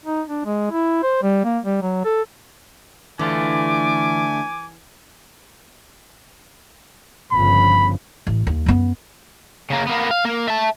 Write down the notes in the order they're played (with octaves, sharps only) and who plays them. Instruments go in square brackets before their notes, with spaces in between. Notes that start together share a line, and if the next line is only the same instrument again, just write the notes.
[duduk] D#4
D4
G#3
E4
C5
G3
A#3
G3
F#3
A4
[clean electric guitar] D3 A3 F4 [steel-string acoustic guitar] E3 [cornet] G#5 [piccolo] D6
[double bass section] G1 C#3 F3 [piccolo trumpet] B5
[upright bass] A1
D#2
F#2 B3
[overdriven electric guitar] C#3 A#3
A#3 B3
F5
A#3
E5 A5